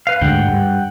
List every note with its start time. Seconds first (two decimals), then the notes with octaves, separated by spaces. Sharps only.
0.07 B4 F5
0.21 D2 G#2 D3 F#5 G5
0.46 G2